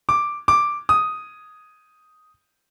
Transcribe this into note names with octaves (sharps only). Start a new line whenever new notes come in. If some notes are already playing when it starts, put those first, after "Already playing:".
D6
D6
D#6